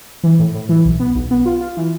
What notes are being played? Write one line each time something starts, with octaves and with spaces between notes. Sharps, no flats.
E3
A2
A2
E3
B1
B3
B1
B3
F4
F4
E3